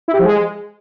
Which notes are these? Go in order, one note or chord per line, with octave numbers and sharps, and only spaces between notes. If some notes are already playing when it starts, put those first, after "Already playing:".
E4
G4
F3
G#3